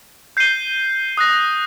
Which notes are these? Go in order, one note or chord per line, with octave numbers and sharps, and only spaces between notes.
G6 C7 D#7 G7
D#6 F#6 A#6